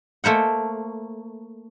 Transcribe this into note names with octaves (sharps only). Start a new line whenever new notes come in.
A3 A#3 C5 F#5